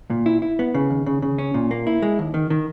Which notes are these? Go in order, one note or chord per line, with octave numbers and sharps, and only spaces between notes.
A#2
E4
E4
B3
C#3
D#2
C#3
C#3
C#4
A#2
A#3
E4
G#3
D#2
D#3
D#3